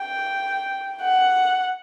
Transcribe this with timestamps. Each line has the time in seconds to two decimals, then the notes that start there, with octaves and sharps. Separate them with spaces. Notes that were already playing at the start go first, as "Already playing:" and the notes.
Already playing: G5
1.02 F#5